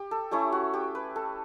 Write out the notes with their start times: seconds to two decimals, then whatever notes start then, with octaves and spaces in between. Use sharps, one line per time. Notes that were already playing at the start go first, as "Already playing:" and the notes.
Already playing: G4
0.11 A4
0.31 A3 C#4 E4 G4
0.52 F#4
0.74 G4
0.95 B4
1.16 A4